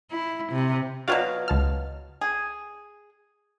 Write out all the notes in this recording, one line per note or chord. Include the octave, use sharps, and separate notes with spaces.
E4
C3
B2 F#3 F4 F#4 D5 F5
C#2 A5 F6
G#4